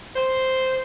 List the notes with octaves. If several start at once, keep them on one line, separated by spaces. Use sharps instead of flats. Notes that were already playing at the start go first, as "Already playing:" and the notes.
C5